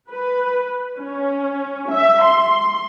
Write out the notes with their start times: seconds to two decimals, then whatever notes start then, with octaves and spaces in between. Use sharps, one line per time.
0.10 B4
0.98 C#4
1.92 E5
2.24 C6